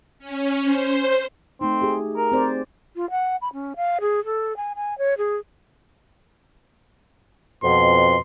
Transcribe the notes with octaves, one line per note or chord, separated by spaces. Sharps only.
C#4
C5
A3 C4 D#4
G4 G#4
A#4
C4 C5 D5
F4
F#5
B5
C#4
F5
G#4
A4
G#5
G#5
C#5
G#4
F2 B2 C6